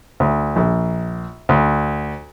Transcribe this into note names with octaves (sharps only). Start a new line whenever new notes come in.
D2
A#1
D2